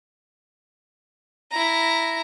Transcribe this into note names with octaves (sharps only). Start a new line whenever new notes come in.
E4 A#5